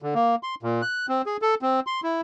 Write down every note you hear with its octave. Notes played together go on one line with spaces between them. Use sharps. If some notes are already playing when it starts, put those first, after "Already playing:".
D3
A#3
C6
A#2
F#6
C4
G#4
A4
C4
C6
E4